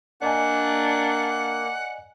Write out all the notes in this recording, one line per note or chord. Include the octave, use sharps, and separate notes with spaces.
A#3 D4 D5 D#5 F#5 G#5